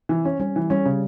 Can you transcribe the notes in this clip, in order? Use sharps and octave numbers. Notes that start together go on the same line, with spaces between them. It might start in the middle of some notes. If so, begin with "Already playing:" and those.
E3 C4
C#4
G3 C#4
E3
G3 C#4
C#3